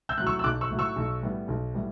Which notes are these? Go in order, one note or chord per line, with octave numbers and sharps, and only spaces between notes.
E6 G6
A2 F#3 F#6
C#6 E6
E6
B1 D6 F#6
C#6 E6
A2 F#3
C#6 E6
B1
A2 G3 B3
B1
A2 G3 B3